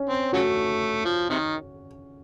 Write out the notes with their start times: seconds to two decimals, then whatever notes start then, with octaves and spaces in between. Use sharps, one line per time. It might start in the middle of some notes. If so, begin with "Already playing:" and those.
Already playing: C#4
0.09 C4
0.33 C#3 F#3 A3 F#4
1.05 F3
1.30 C3 D#3